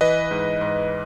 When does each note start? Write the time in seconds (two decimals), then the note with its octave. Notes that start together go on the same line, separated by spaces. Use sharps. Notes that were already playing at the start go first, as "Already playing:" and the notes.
0.01 E3 B4 D#5
0.31 G#2
0.61 G#2